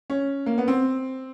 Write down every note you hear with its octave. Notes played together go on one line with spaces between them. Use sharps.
C#4
A#3
B3
C4